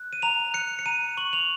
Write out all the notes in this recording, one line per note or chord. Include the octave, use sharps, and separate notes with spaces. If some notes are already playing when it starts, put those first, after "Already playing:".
Already playing: F#6
D#7
A#5 F7
F#6 C#7
C#7
A#5 D#7
C#6 F#7
F7